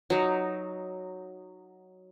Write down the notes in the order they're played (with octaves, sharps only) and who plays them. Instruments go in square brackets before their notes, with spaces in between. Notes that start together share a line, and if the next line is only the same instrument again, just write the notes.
[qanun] F#3 D#4